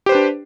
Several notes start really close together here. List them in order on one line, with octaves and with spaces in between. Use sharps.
G4 C5 B4 D4